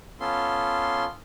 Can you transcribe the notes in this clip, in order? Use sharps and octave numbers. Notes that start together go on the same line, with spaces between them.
B3 C#4 F4 A4 C6